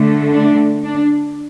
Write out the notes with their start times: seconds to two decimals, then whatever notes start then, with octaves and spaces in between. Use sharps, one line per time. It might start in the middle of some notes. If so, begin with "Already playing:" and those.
Already playing: D3 A3
0.32 D4
0.84 D4